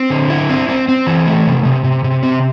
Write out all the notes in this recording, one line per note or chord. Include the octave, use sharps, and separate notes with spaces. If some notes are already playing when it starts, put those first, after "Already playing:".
Already playing: C4
D3
E4
C4
C4
C4
E3
A3
C3
C3
C3
C3
C4